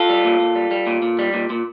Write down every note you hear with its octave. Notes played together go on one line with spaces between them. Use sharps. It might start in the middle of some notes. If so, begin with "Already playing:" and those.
Already playing: F4 A4
G3
A#2
A#2
G3
G3
A#2
A#2
G3
A#2
A#2